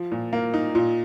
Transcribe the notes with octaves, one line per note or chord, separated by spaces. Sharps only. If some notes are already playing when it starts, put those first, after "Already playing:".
Already playing: F3
A#2
A#3
D#4
A#2